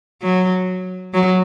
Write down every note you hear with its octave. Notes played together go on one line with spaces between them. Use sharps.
F#3
F#3